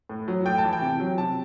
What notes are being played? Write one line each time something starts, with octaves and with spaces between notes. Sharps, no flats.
A2
F#3
A2 G5
A5
E3
G5
C3
F#3
C3 A5